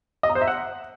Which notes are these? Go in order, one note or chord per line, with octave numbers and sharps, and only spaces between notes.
D#5
A#5
C5
E5
F#5